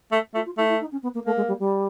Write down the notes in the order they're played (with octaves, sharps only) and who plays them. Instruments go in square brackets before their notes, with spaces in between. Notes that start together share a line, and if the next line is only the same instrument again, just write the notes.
[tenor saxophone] A3
[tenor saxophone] A3 [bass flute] F4
[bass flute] F4
[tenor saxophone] A3 [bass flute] E4
[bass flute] E4
D#4
C#4
B3
A#3
[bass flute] A3 [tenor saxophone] A#3
[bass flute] G#3
G3
G3